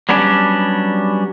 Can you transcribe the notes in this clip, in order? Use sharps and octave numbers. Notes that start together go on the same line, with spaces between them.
F#3 G3 B3 C#4 D4